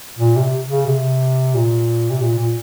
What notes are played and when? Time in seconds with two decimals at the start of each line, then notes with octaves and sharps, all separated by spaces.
0.19 A#2
0.36 C3
0.69 C#3
0.86 C3
1.54 A#2
2.10 C3
2.21 A#2
2.38 A#2